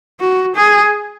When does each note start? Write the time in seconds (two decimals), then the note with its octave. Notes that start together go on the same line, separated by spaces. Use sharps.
0.20 F#4
0.56 G#4